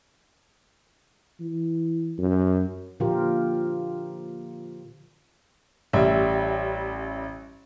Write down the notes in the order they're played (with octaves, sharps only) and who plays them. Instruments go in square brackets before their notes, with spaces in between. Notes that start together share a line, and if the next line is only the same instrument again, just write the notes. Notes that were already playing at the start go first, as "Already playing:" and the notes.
[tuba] E3
F#2
[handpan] A#2 D3 F3 F4 G4 A#4
[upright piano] A1 G3 E5